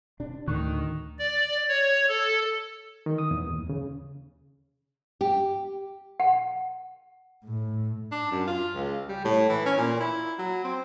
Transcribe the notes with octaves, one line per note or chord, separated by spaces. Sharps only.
C3 D4
D2 A2 D3 D#3 C#6 F#6
D5
C#5
A4
D#3
D#6
E2
D#2
C#3
G4
F#5
A2
D4
F#2
F4
C#2
G3
A2
E3
C#4
A#2
E4
F#3
C4